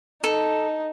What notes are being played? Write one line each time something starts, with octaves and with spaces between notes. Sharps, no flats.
D#4 A4